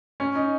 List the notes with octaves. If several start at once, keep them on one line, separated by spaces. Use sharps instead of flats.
C#4
D#4